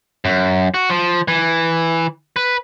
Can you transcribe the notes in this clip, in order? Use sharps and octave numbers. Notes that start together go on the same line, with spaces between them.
F#2
F#4
F3
E3
B4